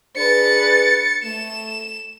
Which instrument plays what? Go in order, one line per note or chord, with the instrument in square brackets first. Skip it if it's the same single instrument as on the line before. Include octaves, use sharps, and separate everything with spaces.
[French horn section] D4 G#4 B4 [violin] A6 C#7
[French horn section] A3 [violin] E7